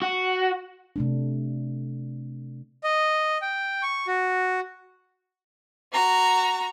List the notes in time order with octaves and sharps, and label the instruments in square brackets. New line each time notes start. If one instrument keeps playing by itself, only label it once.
[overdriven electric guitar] F#4
[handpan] C3 A3 D4
[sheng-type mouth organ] D#5
G5
C#6
F#4
[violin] F#4 A#5